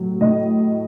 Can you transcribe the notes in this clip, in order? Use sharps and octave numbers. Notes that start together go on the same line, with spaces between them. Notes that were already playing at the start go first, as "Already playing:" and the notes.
Already playing: A2 F#3
A2 D#5